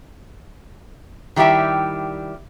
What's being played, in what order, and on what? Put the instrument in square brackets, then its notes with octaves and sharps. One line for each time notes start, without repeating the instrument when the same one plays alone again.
[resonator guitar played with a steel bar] D#3 G3 E4 G4 E5